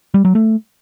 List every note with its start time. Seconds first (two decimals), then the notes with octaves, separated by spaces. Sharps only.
0.14 G3
0.25 F#3
0.35 A3